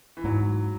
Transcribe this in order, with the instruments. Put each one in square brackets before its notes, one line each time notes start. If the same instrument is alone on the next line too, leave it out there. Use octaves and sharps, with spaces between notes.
[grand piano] E3
[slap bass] G#2 [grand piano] F#3